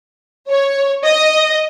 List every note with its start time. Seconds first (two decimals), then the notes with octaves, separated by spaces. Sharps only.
0.49 C#5
1.04 D#5